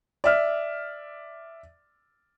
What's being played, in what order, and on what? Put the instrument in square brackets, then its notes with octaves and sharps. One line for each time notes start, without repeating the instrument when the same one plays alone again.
[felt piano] D5 E5 F6